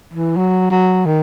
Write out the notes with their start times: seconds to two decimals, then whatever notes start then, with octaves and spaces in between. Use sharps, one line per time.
0.14 E3
0.37 F#3
0.71 F#3
1.06 D#3